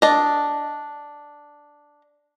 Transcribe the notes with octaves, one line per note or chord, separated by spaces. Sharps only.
D4 D#5